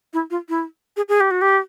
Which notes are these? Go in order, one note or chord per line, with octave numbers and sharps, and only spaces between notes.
E4
F4
E4
G#4
G#4
G4
F#4
G4